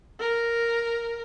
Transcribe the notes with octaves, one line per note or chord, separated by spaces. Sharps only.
A#4